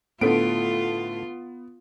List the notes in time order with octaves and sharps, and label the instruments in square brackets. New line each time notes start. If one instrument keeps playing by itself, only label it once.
[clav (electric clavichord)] A2 [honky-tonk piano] D3 A3 D7 [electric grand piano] B3 [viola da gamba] F4